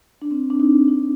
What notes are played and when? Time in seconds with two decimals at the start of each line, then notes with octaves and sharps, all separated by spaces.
0.22 D4
0.31 C4
0.50 D4
0.60 D#4
0.88 D#4